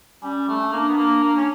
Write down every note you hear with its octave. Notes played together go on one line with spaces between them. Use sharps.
G3 C#4
A3
A#3 D4
B3
A#3
A#3
C#4